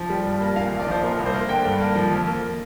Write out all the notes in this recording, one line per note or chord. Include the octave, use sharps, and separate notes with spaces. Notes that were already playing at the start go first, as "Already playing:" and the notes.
Already playing: F3
G3
G2
A#3
A#2 F5
A#1
D5
F3 C5
A#2 A#4
C2
C5
A#3
D3 G5
G2
A#3
F3
F2
A#3